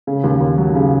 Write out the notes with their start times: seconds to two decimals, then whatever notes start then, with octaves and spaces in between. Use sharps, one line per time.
0.07 C#3
0.24 D#2
0.40 D#2
0.58 F#3
0.75 C#3